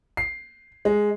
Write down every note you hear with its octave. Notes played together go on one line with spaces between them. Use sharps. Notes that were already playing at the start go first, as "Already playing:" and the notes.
C7
G#3